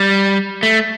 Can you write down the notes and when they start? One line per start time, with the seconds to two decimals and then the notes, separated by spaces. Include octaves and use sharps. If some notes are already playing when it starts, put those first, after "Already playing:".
Already playing: G3
0.63 A3